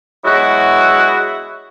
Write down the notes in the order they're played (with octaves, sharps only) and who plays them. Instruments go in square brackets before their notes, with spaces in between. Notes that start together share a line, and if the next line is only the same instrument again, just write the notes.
[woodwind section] F#3 G#3 B3 E4 F#4